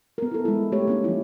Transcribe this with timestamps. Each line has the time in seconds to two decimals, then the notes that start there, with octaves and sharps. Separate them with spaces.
0.18 B3 A#4
0.31 E4 A4
0.45 G#3 E4
0.72 A3 G4 C#5
0.88 A#3 C#4 D#4
1.04 F3 E4